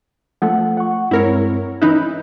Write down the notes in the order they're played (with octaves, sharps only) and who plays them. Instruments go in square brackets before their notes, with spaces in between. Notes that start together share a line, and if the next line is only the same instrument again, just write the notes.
[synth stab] F3 A3 [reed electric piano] F#5
[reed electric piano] F#5 C#6
[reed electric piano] G2 G#3 C4 [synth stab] E4 A#4 C#5
[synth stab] E3 D#4 E4 [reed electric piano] C#4 F#6 G6